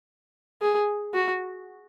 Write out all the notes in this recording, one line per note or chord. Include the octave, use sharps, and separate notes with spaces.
G#4
F#4